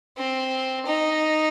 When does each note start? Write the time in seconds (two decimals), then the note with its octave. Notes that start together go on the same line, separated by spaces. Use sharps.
0.18 C4
0.86 D#4